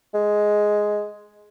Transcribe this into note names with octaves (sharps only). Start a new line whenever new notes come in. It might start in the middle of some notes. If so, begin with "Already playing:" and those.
G#3